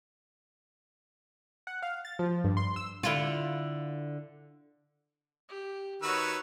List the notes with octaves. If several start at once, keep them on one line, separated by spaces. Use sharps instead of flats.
F#5
F5
A6
F3
G2
C6
E6
D3 E4 F4
G4
D#3 F#4 B4 C#5 E6